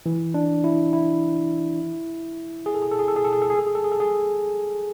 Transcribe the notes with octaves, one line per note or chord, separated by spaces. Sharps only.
E3
D4
E4
E4
G#4
A4
G#4
A4
G#4
A4
G#4
A4
G#4
A4
G#4
A4
G#4
A4
G#4
A4
G#4